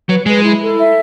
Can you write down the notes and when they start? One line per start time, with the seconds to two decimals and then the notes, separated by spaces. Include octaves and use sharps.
0.09 F#3 B4
0.26 G#3 B4
0.43 E4
0.60 A4
0.78 E5